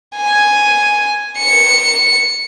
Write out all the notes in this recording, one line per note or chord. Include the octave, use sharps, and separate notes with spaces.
G#5
C#7